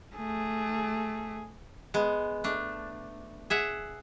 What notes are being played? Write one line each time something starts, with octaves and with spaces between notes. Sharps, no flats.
A3 G#4
G#3 B3
A3 D4
G#4 E5 F#5